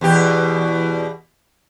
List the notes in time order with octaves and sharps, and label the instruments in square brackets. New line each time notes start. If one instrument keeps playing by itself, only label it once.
[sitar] E2 B2 G4